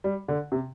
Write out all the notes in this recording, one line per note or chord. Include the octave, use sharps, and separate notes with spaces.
G3
D3
C3